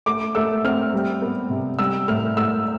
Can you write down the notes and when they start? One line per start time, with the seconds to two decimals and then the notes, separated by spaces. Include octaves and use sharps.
0.06 A3 D6
0.35 A3 E6
0.64 C4 F6
0.93 G3
1.22 B3
1.50 C3
1.79 G3 E6
2.08 A2 F6
2.37 A2 E6